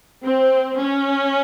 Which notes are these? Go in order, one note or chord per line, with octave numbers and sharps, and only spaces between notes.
C4
C#4